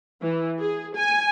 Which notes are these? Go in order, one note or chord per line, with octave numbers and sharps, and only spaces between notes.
E3
G#4
G#5